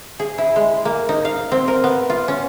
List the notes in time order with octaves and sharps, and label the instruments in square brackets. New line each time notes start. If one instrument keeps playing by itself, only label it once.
[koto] G#4
E4
G#3
A#3
D#4
F5
C4
A#4
B3
F4
C#4